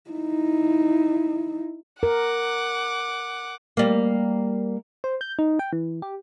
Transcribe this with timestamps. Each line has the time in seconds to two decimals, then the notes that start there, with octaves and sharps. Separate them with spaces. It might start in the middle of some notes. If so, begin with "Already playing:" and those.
0.11 D#4 E4
2.03 A#4 F#5 D6
3.77 G3 A#3
5.04 C5
5.21 G6
5.39 D#4
5.59 G5
5.73 E3
6.02 G4